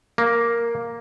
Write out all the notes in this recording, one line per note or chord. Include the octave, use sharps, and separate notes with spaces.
A#3